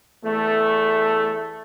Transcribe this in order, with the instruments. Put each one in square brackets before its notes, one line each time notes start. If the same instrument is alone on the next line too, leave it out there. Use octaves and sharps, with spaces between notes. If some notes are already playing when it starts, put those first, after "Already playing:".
[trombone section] E2 A3